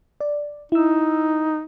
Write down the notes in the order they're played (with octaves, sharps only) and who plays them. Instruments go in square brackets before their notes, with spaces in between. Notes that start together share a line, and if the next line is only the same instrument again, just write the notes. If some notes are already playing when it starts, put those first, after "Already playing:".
[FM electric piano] D5
[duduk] D#4 [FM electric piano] E4 E6